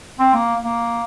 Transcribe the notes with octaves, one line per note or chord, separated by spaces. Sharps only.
C4
A#3
A#3